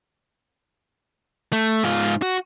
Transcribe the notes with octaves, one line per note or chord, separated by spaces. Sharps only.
A3
G#2 F4
F#4